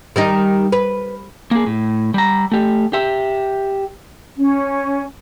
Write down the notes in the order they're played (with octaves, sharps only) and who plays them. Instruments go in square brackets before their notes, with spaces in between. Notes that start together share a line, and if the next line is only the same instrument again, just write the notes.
[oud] D#3 G3 D#4
B4
[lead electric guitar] A#3 G#4
A2
G3 A#5
A3 G4
G4 E5
[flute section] C#4